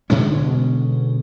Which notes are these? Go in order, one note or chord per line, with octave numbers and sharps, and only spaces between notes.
B2 D3 G#3 C#4